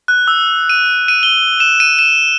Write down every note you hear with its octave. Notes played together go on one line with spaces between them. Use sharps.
F#6
E6
D#7
D#7
G7
E7
D#7
E7